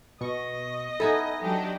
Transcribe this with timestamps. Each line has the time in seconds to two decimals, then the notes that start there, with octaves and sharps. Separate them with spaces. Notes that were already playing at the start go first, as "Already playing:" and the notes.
0.21 B2 D#5 C#6
1.00 B3 D#4 E4 A4 G#5
1.43 F#3 D4 G4